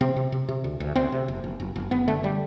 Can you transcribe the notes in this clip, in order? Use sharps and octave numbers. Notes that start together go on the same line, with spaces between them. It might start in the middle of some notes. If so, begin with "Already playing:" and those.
C3 C4
C3
C3
C3
D2
D2
D2 C4
C3
F#1
F#1
F#1
F#1
F#1 B3
D3 A3
D3 G3